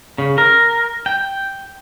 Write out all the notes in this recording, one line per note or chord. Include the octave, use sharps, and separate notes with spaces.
C#3
A#4
G5